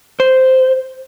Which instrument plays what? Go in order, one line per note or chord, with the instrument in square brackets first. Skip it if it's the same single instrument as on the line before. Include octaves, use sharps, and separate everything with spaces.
[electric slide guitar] C5